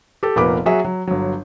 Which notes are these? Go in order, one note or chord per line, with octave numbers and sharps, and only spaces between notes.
G4 A4
F1 A#2 A#3 B3 B5 D6
F#3 F#4 G#4 E5
F#3
G1 F#3